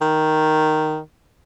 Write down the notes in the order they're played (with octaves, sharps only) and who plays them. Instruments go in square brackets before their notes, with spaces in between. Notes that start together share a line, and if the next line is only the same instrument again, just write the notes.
[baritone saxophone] D#3